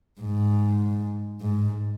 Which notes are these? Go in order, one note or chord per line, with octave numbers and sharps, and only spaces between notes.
G#2
G#2